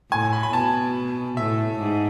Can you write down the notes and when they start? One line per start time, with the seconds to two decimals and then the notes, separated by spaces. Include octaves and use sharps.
0.11 A2 G#5
0.33 B5
0.43 B5
0.53 B2 A5
1.37 A2 E5
1.79 G#2